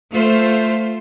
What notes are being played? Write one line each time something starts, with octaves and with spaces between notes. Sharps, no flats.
A3 F4 C5